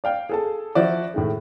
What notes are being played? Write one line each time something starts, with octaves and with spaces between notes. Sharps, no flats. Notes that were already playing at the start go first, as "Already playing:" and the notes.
D5 F5 G5
G#4 A4 A5
F3 E4 F#4 D5
A2 D#3 G#3